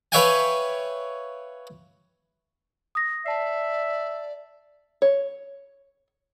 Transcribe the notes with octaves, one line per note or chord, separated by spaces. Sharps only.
B4 C#5 E5 F5 G5 G#5
D#6 A#6
D5 E5 A5 C7
C#5